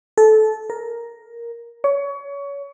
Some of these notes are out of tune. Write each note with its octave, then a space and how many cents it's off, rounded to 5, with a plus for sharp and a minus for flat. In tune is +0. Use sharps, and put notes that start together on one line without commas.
A4 -20
A#4 +5
C#5 +25